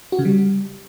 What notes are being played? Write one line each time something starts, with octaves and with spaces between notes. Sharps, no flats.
F#4
C#3
G3